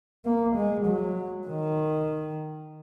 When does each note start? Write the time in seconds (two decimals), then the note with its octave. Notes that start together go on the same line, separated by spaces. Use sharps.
0.25 A#3
0.56 G#3
0.86 F#3
1.47 D#3